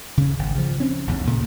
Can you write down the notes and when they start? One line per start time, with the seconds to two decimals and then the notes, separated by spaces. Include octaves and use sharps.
0.17 C#3 C#4
0.39 G#1
0.55 C#3 F3
0.80 C4 C#4
1.07 A1 E2 G#2
1.27 A#2 C#3 A3